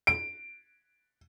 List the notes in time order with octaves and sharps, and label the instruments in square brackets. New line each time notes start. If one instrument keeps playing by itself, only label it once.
[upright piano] D7